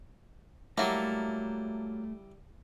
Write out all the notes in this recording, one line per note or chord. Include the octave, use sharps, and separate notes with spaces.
F#3 G3 A3 A#3 E4 A5